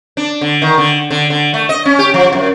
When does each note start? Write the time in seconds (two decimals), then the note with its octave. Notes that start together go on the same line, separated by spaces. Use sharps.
0.17 D4
0.41 D3
0.62 D#3
0.78 D3
1.11 D3
1.30 D3
1.54 A3
1.69 D#5
1.85 C#4
1.99 G4
2.14 F3
2.33 F#2